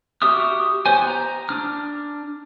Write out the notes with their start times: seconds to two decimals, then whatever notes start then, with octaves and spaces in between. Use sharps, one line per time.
0.22 F#4 G4 E5 D#6 F6
0.86 B3 C5 G#5
1.07 A#5
1.49 D4 F6